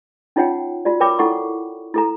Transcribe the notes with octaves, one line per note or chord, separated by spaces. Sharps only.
C#4 D#4 F4 C#5 F#5 G5
F4 F#4 D5
A#4 C#5 G5 B5 D6
E4 A4 F#5 C#6
E4 A4 A#5